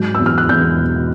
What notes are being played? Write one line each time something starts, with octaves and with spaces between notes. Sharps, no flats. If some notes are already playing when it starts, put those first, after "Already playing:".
Already playing: G#2 F#3 G6
E2 E6
F6
F#6
E2 G6
B2